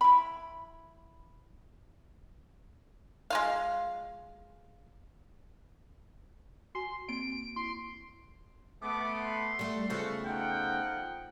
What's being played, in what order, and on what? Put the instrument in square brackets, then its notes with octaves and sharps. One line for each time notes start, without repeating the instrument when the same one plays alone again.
[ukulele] E4 B5
[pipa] G#3 F4 F5
[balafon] F#4 G#5 [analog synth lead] C6
[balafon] A#3 C4 [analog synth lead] D7
[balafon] E4 [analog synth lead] C6
[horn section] A3 B3 [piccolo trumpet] D6
[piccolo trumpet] C6
[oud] G3 A3
[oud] C#3 A3 B3 [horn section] F3 F#4
[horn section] F3 D#4 F#5 [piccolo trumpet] G5